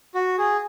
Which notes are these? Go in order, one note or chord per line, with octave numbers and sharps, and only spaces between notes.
F#4
G#4